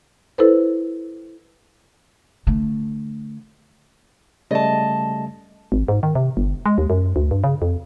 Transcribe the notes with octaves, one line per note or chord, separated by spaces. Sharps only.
E4 A4 B4 C5
D3 A3
C#3 G3 A3 D#5 A5
G#1
G#2
D#3
C3
G1
G#3
D#2
F#2
D2
G2
C#3
F2